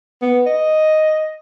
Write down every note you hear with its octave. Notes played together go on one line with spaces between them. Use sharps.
B3
D#5